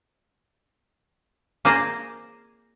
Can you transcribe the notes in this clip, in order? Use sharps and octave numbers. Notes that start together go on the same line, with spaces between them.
A#3 F4 G#4 C5 D5 A#5